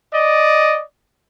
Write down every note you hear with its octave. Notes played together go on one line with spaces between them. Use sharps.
D5 D#5